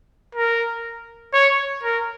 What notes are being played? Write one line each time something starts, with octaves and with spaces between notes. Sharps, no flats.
A#4
C#5
A#4